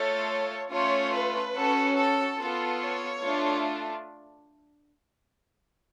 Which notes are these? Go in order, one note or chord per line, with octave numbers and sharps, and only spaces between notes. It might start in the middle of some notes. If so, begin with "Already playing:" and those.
Already playing: A3 F4 A4 C#5
A3 C#4 F4 C#5
B4
C#4 F#4 A4
A4
B3 F4 A4
C#5
A3 D4 F4